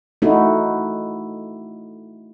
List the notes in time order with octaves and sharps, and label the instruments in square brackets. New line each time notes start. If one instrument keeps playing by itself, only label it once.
[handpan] A3 D#4 E4 F#4